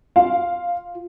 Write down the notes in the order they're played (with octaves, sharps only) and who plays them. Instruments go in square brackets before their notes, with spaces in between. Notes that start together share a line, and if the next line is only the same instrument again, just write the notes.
[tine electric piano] F4 [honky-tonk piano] F5